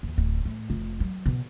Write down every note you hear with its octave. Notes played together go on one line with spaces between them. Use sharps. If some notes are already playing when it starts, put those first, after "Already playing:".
D#2
D1
A2
F1
F#3
B2